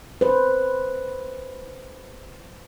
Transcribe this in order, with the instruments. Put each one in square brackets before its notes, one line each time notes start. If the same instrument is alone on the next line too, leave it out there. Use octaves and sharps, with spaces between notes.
[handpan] B4 C5